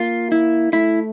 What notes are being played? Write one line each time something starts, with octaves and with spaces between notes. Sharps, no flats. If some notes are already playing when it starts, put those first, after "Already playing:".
Already playing: A#3 F4
E4
A3 E4